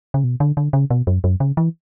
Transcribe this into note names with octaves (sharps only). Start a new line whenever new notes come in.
C#3
B2
D3
D3
C#3
B2
F#2
F#2
C#3
E3